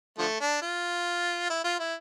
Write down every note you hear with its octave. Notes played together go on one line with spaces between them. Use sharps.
D3 F3 A3
D4
F4
E4
F4
E4